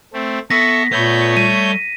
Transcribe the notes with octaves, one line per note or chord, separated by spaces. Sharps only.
A3 C4
B3 A4 E5 C#6 A#6 B6
A#2 A3 B3 C#5 B5 G6
G3 D#7